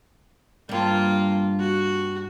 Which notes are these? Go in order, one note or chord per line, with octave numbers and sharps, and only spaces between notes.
G2 G3 A#3 F4
F#4